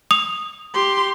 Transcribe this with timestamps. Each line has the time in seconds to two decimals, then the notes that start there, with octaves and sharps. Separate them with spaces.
0.11 D#6 F7
0.74 G4 C6